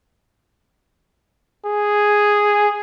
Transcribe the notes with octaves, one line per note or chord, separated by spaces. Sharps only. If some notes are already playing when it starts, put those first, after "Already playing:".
G#4